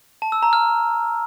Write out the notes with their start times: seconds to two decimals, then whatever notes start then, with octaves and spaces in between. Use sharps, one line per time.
0.22 A5
0.32 E6
0.43 A#5
0.53 F6